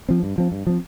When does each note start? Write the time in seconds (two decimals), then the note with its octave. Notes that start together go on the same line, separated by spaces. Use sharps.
0.09 F3 C4
0.23 G2
0.38 F3 C4
0.52 G2
0.67 F3 C4